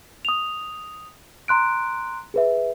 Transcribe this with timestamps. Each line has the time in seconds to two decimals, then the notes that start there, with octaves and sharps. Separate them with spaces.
0.25 D#6 F7
1.48 A#5 C6 F#6 D7
2.34 G#4 B4 E5